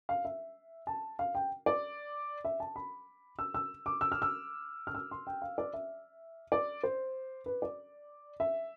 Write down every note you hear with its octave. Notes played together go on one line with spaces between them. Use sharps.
F5
E5
A5
F5
G5
D5
E5
A5
B5
E6
E6
D6
E6
F6
E6
F6
E6
C6
G5
F5
D5
E5
D5
C5
B4
D5
E5